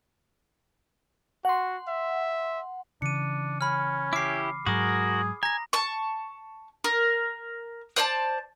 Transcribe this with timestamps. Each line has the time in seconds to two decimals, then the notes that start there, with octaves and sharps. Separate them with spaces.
1.45 F#4 F#5 C6
1.88 E5
3.02 C#3 E3 D4 C#7 D#7
3.61 C#4 B5 F6
4.13 E4 G4 D6 C7
4.66 G#2 F#3 F#4 G#4 A#4 D#6
5.43 G#5 A#5 A#6
5.73 A5 C#6
6.84 A#4
7.96 C5 D5 G5 A5